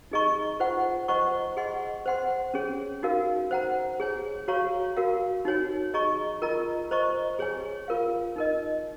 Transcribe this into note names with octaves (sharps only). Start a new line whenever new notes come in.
D#4 G#4 D#5 A#5 C#6
F4 C5 F#5 C#6
C5 D#5 F#5 A#5 C#6
G#4 D#5 F#5 C6
C5 F#5 C6
C#4 G#4 C#5
D#4 F#4 A#4 F5
C5 F#5 A#5
G#4 C#5 G#5
F#4 C#5 F5 A#5 C#6
F#4 A#4 F5
D#4 F#4 C#5 G#5
G#4 D#5 A#5 C#6
F4 A#4 D#5 A#5
C5 D#5 A#5 C#6
G#4 C#5 G#5
F4 A#4 F5
D#4 A#4 D#5